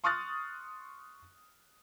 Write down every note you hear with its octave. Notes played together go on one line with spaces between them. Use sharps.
C6 C#6 D#6 F6 F#6 A6